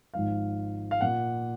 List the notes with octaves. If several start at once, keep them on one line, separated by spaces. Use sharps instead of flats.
G#1 G#2 F3 F5
F5
A#2 F#5